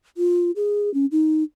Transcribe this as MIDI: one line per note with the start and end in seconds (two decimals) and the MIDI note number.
0.17 0.51 65
0.56 0.92 68
0.94 1.06 61
1.11 1.43 63